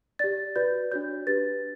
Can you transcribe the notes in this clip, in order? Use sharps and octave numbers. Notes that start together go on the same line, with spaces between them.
G4 D5 A6
F#4 B4 D5 G6
D4 F#4 C#5 G6
D4 G4 B4 A6